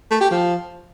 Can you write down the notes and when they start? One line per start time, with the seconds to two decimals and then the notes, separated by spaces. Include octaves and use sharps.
0.11 A3
0.21 G4
0.31 F3